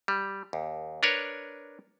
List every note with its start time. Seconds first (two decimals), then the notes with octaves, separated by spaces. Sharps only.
0.08 G3
0.53 D#2
1.03 D4 A#4 B4 C#5